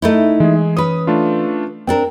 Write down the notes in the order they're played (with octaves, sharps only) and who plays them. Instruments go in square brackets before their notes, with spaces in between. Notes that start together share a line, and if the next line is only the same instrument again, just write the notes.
[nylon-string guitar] A3 D#4 E4
[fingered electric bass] E3 [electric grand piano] G#3 G#4
[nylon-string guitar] C#4 B4 [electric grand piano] D#6
[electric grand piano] A3 D4 F4
[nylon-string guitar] C4 D4 A#4 [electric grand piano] G5